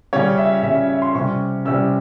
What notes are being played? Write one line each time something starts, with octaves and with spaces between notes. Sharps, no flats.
C#3 G3 C#4 C#5
E5
C#3 G3 C#4 E5
E5
C6
C3 G3 C#4 C#6
C3 G3 C#4 E6